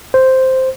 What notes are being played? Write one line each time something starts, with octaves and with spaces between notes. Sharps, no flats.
C5